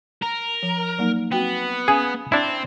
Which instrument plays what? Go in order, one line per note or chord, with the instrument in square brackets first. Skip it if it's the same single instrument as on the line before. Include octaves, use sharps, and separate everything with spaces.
[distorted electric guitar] A#4
[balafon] F3
F#3 A#3 D#4
[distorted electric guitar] B3 [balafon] C4 F#4 G5
[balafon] C#4 F5 G#5 [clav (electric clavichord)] G#4
[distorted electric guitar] C4 [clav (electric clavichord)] D4 E4